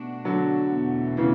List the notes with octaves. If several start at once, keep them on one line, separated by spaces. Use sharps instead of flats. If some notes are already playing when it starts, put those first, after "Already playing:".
Already playing: B2 A3 D4 F#4
D3 F#3
E2 B2 A3
C#3 E3